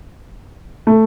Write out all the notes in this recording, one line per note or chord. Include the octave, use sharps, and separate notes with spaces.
A3